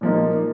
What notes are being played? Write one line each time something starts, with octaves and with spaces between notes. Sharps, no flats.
A#2 F3 A#3 D#4